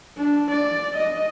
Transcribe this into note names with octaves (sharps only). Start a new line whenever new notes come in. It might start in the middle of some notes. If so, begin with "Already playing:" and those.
D4
D5
D#5